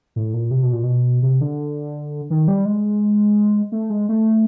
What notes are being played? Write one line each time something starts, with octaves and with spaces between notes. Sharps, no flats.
A2
A#2
C3
B2
A#2
B2
C3
D3
D#3
G3
G#3
A3
G#3
A3